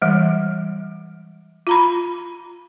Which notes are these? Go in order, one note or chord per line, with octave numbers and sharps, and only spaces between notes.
E3 G3 G#3
F4 A#5 B5